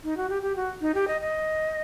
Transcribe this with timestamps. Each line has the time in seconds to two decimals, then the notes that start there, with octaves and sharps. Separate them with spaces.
0.04 D#4
0.17 F#4
0.30 G4
0.42 G4
0.56 F#4
0.81 D#4
0.95 G4
1.08 D#5
1.21 D#5